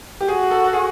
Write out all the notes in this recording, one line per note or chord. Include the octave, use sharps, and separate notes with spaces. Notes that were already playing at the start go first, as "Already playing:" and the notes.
G4
F#4 G#4
A4
A4
G#4